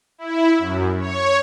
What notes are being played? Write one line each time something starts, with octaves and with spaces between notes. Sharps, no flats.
E4
F#2
C#5